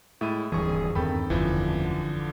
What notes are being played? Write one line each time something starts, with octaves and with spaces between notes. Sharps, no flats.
A2 G#3 E4 D#7
D1 G#1 G2 E3 G#4 C#6
E2 G2 D#3 C4 A4 G5 B5
F#1 E2 D3 E3 F3 C#4